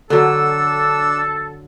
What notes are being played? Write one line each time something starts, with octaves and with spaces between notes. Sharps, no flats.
D3 F#3 D4 A4 E6